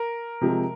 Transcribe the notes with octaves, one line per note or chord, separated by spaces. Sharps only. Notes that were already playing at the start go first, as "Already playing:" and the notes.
Already playing: A#4
C3 F3 G#3